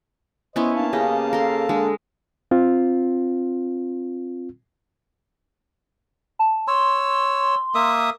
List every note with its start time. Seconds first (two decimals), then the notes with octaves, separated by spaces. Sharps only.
0.56 B3 C#4 E4 C5 D#5
0.76 A#3 D4 F5 A5
0.93 C#3 G4 D#5 G#5
1.33 A4 A#4 C6
1.69 D3 G#3
2.51 C4 F4
6.39 A5
6.68 C#5 C6 E6
7.75 A#3 E5 D#6